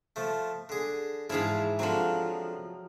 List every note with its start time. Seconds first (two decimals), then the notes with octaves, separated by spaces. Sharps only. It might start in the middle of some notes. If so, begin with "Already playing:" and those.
0.16 F3 A3
0.69 D3 G#4
1.30 G#2 E3 F3 E4 G#4
1.79 D3 F3 F#3 C4